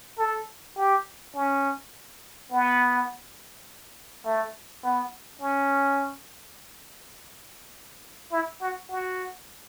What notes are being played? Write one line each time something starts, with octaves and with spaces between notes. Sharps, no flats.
A4
G4
C#4
B3
A3
B3
C#4
E4
F#4
F#4